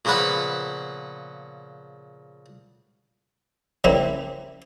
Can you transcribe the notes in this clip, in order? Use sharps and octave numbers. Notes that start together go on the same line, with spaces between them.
A#2 C#3 F3 B3 B4 F#5
C#3 G3 A#3 C4 E4